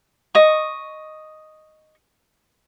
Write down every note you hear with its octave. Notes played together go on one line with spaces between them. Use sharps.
D#5 C#6